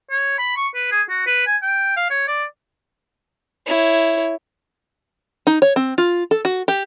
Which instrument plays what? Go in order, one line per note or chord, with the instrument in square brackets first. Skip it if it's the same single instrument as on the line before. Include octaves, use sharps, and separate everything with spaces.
[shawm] C#5
B5
C#6
B4
G#4
F#4
B4
G#5
G5
F5
C#5
D5
[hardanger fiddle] E4 C#5
[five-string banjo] D#4
C#5
C4
F4
A4
F#4
G4